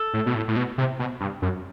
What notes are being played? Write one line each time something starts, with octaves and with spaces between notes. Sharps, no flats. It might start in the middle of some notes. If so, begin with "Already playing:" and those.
Already playing: A4
A2
B2
A2
A2
B2
C3
B2
G2
F#2